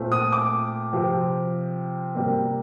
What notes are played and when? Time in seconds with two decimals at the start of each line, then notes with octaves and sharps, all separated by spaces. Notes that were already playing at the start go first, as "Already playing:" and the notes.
Already playing: A#2 A3 C4
0.12 D#6
0.32 D6
0.93 C3 F3 C4
2.15 C3 G3 A#3